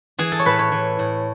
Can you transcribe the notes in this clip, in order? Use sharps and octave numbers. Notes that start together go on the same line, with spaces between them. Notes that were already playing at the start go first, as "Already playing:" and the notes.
E3 G#4
A4
C#5
A2 B4
C#5
E3
A2